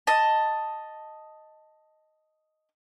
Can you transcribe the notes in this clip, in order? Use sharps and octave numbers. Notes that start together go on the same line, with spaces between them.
D#5 A5